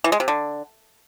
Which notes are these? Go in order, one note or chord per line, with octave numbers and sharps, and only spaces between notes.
E3
G#3
C3
D3